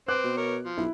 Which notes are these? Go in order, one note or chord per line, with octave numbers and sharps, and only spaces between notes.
C4 B4 D6 F#6
B2
A#4 C#5
F3
B1 E4